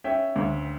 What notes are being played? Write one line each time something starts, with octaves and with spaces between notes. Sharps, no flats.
C#4 E5 G5
D2